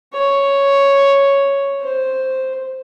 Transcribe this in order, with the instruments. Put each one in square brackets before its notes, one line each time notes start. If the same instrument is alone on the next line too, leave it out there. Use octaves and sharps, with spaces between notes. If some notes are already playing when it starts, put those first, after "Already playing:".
[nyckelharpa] C#5
C5